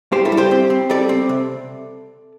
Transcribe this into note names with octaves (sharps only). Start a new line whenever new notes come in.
G2 G4 C5
E4 A4
G3
G4 C5
C4
C4
G3 A4 D5
C4
C3